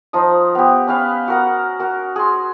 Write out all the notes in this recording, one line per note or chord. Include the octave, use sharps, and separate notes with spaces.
F3 D#4 D#5
B3 G4
C#4 B4 F5
F#4 A#4 F#5
F#4 A#4
G#4 C6